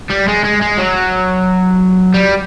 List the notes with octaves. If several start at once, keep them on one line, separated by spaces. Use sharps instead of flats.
G3
G#3
G#3
G#3
F#3
G3